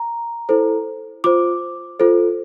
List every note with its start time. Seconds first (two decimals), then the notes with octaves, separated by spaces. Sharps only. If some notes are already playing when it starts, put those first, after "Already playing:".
Already playing: A#5
0.49 E4 A4 C5
1.24 F4 C5 D6
1.99 F4 A4 C5